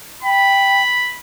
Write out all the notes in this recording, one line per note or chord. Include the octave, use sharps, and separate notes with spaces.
G5 B5